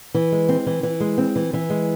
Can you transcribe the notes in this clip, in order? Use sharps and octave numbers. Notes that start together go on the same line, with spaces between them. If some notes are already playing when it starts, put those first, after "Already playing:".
E3
G#3
C4
E3
E3
G#3
C4
E3
E3
G#3